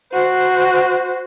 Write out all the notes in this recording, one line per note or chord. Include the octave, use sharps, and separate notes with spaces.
F#4 C5